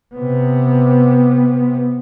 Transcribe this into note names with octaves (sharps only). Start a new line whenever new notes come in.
C3 B3